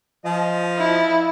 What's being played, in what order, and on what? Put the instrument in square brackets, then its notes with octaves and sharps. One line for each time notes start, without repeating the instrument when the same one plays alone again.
[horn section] F3 D#5
[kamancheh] E4